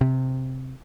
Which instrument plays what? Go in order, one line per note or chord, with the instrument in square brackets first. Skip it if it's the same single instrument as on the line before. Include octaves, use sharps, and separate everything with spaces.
[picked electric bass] C3